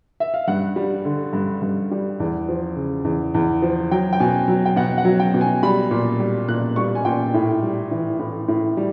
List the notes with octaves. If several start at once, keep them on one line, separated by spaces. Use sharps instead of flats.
E5
F5
G2 F#5
G3
D3
G2
G2
G3
E2
F3
C#3
E2
E2
F3
F#3 G5
G5
B2 G#5
F#3
G5
B2 F#5
F#5
F#3
G5
B2
G#5
G3 B5
A#2
G3
A#2 F#6
G3 C#6
G#5
A#2 G5
A2
G3
E3
A2
A2
G3